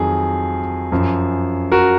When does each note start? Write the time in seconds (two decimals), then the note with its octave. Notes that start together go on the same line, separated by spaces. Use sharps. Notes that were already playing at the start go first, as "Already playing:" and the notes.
Already playing: F2 D#3 F#3 G#4
0.92 F#2 F3
1.72 F#4 A#4